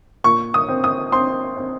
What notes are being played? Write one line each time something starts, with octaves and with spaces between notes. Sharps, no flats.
A#2 C#6
D#6
C4
D#6
C4 C6
C4